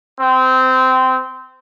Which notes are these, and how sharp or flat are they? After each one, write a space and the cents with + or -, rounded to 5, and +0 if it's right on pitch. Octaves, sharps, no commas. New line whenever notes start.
C4 -20